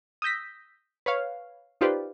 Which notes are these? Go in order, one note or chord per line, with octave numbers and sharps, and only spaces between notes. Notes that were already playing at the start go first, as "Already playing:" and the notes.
D#6 E6 G6 A#6 B6
B4 C#5 F5
D#4 F4 G4 B4 C5 D5